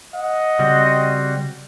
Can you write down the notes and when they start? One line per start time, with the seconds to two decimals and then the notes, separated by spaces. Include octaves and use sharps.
0.14 D#5 F#5
0.59 C#3 G3 C4 F#4